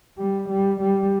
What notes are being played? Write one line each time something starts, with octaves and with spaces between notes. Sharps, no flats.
G3
G3
G3